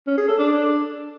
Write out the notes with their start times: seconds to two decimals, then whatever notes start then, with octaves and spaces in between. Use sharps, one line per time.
0.07 C#4
0.17 G#4
0.28 A4
0.38 D4